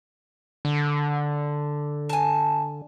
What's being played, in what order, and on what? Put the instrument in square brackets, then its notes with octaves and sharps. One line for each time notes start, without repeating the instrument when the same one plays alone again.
[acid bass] D3
[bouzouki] G#5 A5